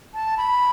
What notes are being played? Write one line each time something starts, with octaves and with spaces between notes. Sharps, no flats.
A5
B5